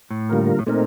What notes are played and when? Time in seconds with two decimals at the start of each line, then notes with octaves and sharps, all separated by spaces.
0.11 A2
0.29 D3 G3 A#3 F4 A#4
0.59 A2
0.67 A#2 A3 C4 D#4 A#4